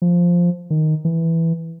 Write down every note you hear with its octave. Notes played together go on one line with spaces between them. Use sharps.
F3
D#3
E3